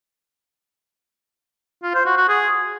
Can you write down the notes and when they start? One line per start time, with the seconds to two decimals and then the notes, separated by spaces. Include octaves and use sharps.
1.83 F4
1.95 C5
2.06 F#4
2.17 F#4
2.29 G#4